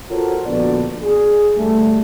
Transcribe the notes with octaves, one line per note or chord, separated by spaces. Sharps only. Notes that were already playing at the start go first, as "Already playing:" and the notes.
F4 F#4 A4 A#4 C5 C#5
A#1 D3 B3 F#4 D5
G#4
G2 D3 G3 A3